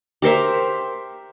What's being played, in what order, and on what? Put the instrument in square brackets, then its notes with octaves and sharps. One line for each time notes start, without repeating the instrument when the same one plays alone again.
[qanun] G4 A#4 C5 E5